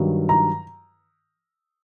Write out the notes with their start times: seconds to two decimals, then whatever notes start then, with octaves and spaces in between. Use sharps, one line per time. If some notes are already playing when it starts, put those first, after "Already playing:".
Already playing: G2 D#3 F#3
0.29 A#5